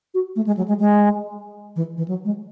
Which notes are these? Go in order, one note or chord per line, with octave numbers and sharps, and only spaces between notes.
F#4
A3
G#3
F#3
G#3
G#3
E3
E3
F#3
G#3